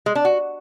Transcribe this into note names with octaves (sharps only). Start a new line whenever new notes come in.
G#3
D4
F#4